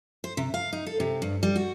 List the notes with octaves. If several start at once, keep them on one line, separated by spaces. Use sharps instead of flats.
C5
C3
F5
D#4
A4
C3
G2
G3
F#4